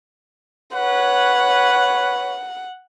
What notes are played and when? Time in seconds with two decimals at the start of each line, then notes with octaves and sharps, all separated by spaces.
0.74 B4 C#5 F#5